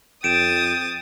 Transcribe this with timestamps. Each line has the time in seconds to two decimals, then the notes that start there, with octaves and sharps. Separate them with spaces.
0.24 F2 G5 D#6 A6 D7 E7